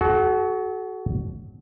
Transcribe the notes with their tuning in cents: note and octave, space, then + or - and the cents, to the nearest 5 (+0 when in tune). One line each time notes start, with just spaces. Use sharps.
F#4 +15 A4 -40